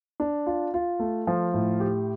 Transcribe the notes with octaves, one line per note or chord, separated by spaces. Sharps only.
D4
F4
F4
A3
F3
A2
G4